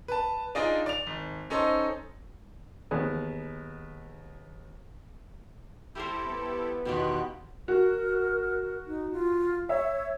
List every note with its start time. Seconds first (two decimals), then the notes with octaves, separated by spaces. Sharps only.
0.08 B4 A5
0.55 D4 D#4 F4 G#4 D5 D#5
0.86 D5 F7
1.07 G#1
1.50 C#4 D#4 A4 C5 D#5
2.91 D#2 B3 G#4
5.95 G3 E4 G4 A4 A#4 C5
6.27 B3
6.85 E2 B2 D#3 F4 G4 F#6
7.68 F#4 A#4
8.87 D#4
9.12 F4
9.69 C#5 E5